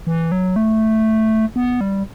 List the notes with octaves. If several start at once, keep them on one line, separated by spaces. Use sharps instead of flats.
E3
F#3
A3
B3
G3